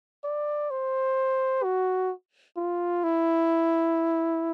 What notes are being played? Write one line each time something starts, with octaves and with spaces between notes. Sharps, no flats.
D5
C5
F#4
F4
E4